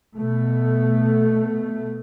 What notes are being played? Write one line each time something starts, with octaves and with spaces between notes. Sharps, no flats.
B2 A3